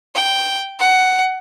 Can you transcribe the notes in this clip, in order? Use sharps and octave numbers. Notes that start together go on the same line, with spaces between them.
G5
F#5